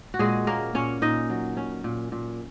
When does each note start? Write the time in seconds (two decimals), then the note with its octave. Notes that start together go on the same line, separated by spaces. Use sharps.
0.14 F#4
0.19 A#2 G#3 G#4
0.47 A#3 C#4 A#4
0.75 A#2 C#4 C#5
1.02 A#2 D#4 D#5
1.30 F#3
1.57 C#4
1.84 A#2
2.12 A#2